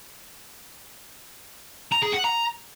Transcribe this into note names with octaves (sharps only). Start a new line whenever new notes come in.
A#5
G#4
F#5
A#5